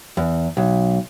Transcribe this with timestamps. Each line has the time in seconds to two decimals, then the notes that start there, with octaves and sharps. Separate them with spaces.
0.17 E2
0.57 B1